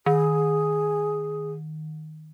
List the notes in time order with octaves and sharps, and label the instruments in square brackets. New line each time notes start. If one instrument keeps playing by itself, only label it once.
[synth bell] D#3 [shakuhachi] G#4